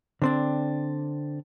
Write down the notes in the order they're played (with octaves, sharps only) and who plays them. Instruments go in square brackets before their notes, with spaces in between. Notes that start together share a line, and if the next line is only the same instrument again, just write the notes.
[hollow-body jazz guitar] D3 C4 D4